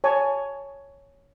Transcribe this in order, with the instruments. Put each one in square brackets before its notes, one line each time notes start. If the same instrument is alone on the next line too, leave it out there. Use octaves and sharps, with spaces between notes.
[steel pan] C#5 G#5 A5